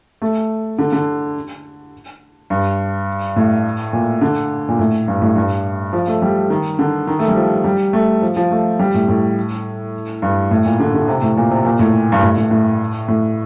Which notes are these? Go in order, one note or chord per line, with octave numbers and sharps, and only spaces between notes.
A3
D3
D3
G2
A2
A#2
D3
A#2
A2
G2
A2
G2
F3
A3
G3
D#3
D3
D#3
A3
G3
F3
G3
A3
F3
F3
A3
G3
A2
A2
G2
A2
A#2
D3
D3
C3
A2
A#2
C3
A#2
A2
G2
A2
A2
A2
A2